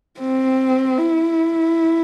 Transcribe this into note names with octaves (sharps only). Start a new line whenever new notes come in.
C4
E4